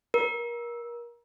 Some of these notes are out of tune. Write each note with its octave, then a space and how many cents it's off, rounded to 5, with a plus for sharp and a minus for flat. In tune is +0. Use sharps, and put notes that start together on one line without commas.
A#4 +30